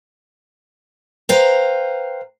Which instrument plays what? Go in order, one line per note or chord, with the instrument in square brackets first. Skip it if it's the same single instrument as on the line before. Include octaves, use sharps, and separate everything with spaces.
[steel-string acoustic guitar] B4 C5 F5 G5 A#5